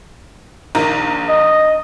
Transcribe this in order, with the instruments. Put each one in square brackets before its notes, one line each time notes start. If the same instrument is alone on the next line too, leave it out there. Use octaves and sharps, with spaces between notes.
[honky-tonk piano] A#1 D#3 A#5
[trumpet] D#5